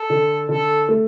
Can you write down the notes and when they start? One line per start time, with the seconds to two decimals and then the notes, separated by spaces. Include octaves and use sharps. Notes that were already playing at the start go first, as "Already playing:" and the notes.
Already playing: A4
0.10 D3
0.49 D3 A4
0.89 A3